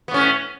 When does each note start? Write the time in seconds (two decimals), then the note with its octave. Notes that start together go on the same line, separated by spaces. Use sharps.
0.08 B3
0.11 A2
0.14 C#4